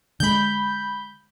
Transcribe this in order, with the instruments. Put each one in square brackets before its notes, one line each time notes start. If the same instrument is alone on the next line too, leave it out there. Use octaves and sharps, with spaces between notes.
[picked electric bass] D3 G#3 [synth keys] B5 G6